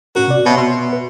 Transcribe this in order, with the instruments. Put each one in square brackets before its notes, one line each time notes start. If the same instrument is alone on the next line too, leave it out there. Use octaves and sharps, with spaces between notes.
[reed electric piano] A2 C#4 A#4 [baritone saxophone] F#4
[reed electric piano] C3 D5
[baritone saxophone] B2 [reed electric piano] B4 C#5 E5
[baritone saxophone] B2 [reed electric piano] E5 C6
[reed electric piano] B4